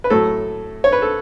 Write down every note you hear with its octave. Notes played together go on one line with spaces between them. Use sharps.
B4
A2 F#3 A3 A4
C#5
B4
A4